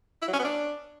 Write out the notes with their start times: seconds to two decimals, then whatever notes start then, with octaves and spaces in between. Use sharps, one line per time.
0.22 E4
0.28 F#3
0.33 C#4
0.39 B3
0.45 D4